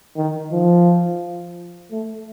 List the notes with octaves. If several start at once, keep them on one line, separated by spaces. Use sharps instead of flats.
D#3
F3
A3